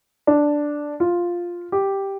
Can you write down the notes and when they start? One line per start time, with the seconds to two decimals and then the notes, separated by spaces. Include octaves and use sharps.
0.27 D4
1.00 F4
1.72 G4